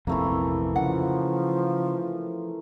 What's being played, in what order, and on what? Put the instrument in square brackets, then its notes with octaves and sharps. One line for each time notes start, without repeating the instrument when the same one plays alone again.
[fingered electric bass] A#1 F2 C3 [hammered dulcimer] E3 A3 A#3 [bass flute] E4
[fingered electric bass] C#3 [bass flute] F3 [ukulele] F#5